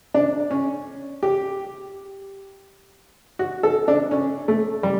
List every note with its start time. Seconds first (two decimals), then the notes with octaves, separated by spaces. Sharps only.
0.14 D4
0.51 C#4
1.23 G4
3.39 F#4
3.63 A4
3.88 D4
4.11 C#4
4.48 A3
4.83 G3